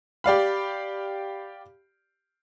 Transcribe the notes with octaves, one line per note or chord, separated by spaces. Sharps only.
G4 D5 F5 B5